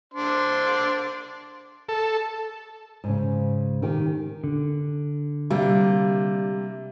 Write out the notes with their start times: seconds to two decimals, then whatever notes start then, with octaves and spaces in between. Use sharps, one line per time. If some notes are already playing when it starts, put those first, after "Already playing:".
0.14 D4 C5 C6
1.89 A4
3.04 G#2 C#3
3.82 D#3 G4
4.44 D3
5.50 C3 G3 A#3